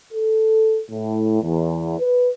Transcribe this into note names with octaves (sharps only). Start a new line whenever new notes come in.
A4
A2
E2
B4